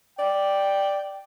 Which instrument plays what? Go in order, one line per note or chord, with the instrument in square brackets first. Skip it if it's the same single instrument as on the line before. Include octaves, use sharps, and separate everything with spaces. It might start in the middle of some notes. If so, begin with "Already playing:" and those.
[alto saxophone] D5 [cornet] G5